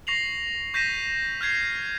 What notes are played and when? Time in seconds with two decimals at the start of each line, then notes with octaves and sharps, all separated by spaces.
0.07 C#6 A#6 C7 F7 F#7
0.74 C#6 G6 A#6 B6 D#7 E7
1.41 F6 G6 G#6 C7